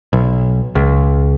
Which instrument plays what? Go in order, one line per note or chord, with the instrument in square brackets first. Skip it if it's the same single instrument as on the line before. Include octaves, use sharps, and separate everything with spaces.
[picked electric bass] B1
C#2